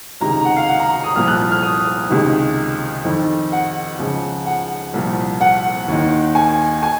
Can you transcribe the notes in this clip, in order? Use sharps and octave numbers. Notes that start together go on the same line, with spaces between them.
C#2 C3 D#3 A#5
A#5
F#5
F5
F#5
A#5
A#5
D#6
C2 A#2 F3 F6
F#6
F6
D#6
C#2 C3 D#3
F2 D#3
F#5
C#2 C#3 F3
F#5
C2 A#2 F3
F#5
D#2 D#3
G#5
G#5